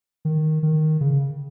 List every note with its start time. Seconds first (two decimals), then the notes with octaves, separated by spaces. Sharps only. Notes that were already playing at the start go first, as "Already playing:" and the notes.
0.25 D#3
0.63 D#3
1.01 C#3